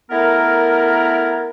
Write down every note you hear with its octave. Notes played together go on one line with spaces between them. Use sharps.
A3 B3 E4 A#4